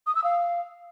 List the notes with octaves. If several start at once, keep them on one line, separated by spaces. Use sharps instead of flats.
D#6
E6
F5